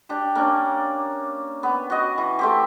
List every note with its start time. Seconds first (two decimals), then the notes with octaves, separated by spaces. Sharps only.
0.09 D4 G4
0.35 A#3 C#4 D4
1.63 B3
1.90 F#4 D#5
2.18 E3
2.39 A3 C4 G4